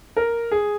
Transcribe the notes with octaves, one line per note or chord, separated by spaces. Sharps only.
A#4
G#4